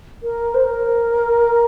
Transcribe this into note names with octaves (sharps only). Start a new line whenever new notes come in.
A#4
C5
A#4